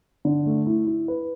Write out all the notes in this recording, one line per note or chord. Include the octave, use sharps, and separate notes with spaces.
D3
A3
E4
E4
B4